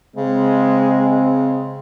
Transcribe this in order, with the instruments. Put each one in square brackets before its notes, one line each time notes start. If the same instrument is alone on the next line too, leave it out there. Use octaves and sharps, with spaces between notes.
[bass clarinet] C#3 [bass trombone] G#3 [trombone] C4